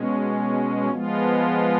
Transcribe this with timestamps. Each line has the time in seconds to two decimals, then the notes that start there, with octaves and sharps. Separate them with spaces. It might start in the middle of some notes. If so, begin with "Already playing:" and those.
Already playing: B2 G#3 C#4
0.90 F3 G#3 B3 F4